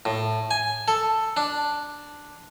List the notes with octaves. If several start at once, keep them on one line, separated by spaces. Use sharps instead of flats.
A2
G#5
A4
D4